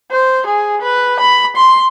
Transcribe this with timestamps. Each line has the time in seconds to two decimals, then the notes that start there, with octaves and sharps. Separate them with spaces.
0.11 C5
0.47 G#4
0.82 B4
1.21 B5
1.56 C6